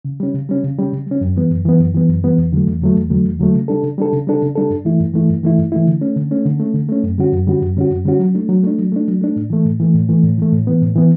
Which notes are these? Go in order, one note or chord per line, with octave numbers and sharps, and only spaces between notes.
C#3
G3 C#4
C#3
G3 C#4
C#3
G3 C#4
C#3
G3 C#4
F#2
E3 G3 B3
F#2
E3 G3 B3
F#2
E3 G3 B3
F#2
E3 G3 B3
E2
D3 F#3 A3
E2
D3 F#3 A3
E2
D3 F#3 A3
E2
D3 F#3 A3
C#3
G3 D4 A4
C#3
G3 D4 A4
C#3
G3 D4 A4
C#3
G3 D4 A4
G2
E3 A3 E4
G2
E3 A3 E4
G2
E3 A3 E4
G2
E3 A3 E4
D3
A3 C#4
D3
A3 C#4
D3
A3 C#4
D3
A3 C#4
F#2
D3 G3 C#4 F#4
F#2
D3 G3 C#4 F#4
F#2
D3 G3 C#4 F#4
F#2
D3 G3 C#4 F#4
F#3
A3 D4
F#3
A3 D4
F#3
A3 D4
F#3
A3 D4
A2
E3 A3
A2
E3 A3
A2
E3 A3
A2
E3 A3
A2
E3 B3
A2
E3 B3